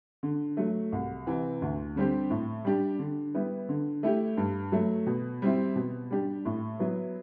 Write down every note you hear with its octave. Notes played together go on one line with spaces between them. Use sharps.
D3
F#3 A3
C2
C3 E3
D2
D3 G3 C4 G4
A2
G3 D4 G4
D3
G3 B3 E4 G4
D3
A3 E4 G4
G2
F#3 A3
B2
G3 C4 E4
B2
G3 D4 G4
A2
F#3 B3 E4